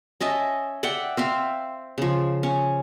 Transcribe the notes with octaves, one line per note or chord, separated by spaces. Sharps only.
C#4 D#5 E5 A5
D5 E5 F#5 G5
C4 E5 F5
C#3 F3
C#4